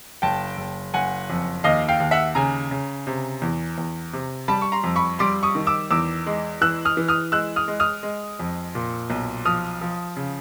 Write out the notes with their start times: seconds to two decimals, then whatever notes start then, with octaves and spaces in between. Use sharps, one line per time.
0.22 F#1 G5 A5
0.57 F#1
0.94 F#1 F#5 G#5
1.30 F2
1.64 D#2 D#5 F5
1.88 F5 G5
2.00 D#2
2.11 E5 F#5
2.35 C#3 G#5 A#5
2.71 C#3
3.07 C3
3.42 E2
3.78 E2
4.13 C3
4.48 G3 A5 B5
4.62 C#6
4.72 A#5 C6
4.84 F2
4.96 B5 C#6
5.19 G3 C6 D6
5.43 C#6 D#6
5.55 D#3
5.67 D6 E6
5.91 E2 D6 E6
6.27 G#3
6.61 E3 E6 F#6
6.85 D#6 F6
6.97 E3
7.08 D#6 F6
7.32 G#3 E6 F#6
7.56 D#6 F6
7.68 G#3
7.80 D#6 F6
8.03 G#3
8.39 F2
8.75 A#2
9.10 B1
9.45 F3 D#6 F6
9.81 F3
10.17 C#3